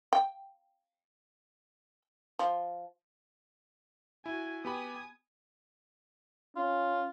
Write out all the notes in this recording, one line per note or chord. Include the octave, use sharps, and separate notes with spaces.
G5
F3
E4 F#4 G#5
B3 G4 G#5 B5 D#6
C#4 F4